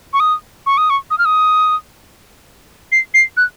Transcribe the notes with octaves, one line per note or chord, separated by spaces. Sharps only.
C#6
D#6
C#6
D#6
C#6
D#6
F6
D#6
C7
C7
F#6